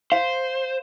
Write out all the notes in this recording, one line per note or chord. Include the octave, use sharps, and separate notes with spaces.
C5 F5